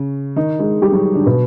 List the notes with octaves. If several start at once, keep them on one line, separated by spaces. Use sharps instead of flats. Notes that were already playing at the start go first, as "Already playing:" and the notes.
Already playing: C#3
D#3 D#4
G#3 G#4
G3 G4
F#3 F#4
D3 D4
B2 B3